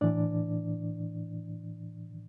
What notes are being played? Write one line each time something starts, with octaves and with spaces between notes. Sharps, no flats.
A2 E3 D4 D5